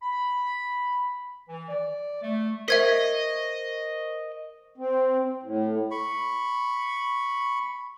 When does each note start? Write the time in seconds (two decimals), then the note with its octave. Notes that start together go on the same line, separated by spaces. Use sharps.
0.02 B5
1.49 E3
1.69 D5
2.22 A3
2.68 A#4 C5 D#5 E5 C#6 G#6 B6
4.78 C4
5.43 A2
5.91 B5 C#6